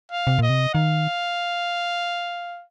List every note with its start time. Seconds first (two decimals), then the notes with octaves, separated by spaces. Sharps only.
0.12 F5
0.27 C3
0.39 A#2 D#5
0.50 C3
0.74 D#3 F5